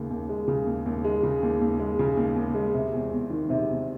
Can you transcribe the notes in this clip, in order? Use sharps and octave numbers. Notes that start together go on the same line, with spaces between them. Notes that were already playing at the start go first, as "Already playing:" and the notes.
Already playing: D#2 C#3
D#2
G#3
C#3
D#2
D#2
G#3
C#3
D#2
D#2
G#3
C#3
D#2
D#2
G#3
C3
E2
E2
D#3
C3
E2